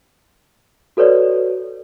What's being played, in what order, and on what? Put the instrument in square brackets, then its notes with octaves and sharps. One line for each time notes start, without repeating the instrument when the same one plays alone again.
[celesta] F#4 A4 B4 C#5 D5